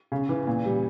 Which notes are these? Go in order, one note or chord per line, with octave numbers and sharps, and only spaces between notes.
C#3
E3
A#2
G3